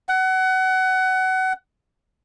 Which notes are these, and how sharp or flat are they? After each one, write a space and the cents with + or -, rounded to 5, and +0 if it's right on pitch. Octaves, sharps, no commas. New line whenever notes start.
F#5 +25